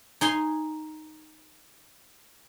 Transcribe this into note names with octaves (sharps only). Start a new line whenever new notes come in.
D#4 G#5 C6